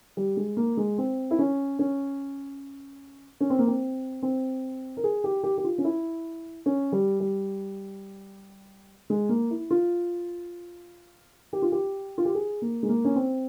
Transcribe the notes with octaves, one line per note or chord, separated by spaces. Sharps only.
G3
G#3
A#3
G#3
C4
E4
C#4
C#4
C#4
C4
A#3
C4
C4
A#4
G#4
G4
G4
G4
F4
C#4
E4
C#4
G3
G3
G#3
A#3
E4
F4
G4
F4
G4
F4
G4
G#4
A#3
G#3
A#3
C#4
C4